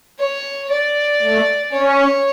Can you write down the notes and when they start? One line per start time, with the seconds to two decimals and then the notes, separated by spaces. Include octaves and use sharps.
0.19 C#5
0.70 D5
1.22 A3
1.73 C#4 C#5